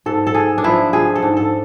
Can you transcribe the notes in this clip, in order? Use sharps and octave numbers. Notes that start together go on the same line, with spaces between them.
G#2 A4
A4
G#2 G#4
D4
F3 E4
F3 G#4
A4
G#2
A4